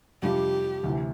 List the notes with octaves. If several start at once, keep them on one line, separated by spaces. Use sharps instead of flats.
F2 C3 G3 D4 F4 G4
D2 C3 E3